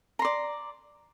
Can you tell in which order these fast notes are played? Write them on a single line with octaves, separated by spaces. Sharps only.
A#5 C6 D5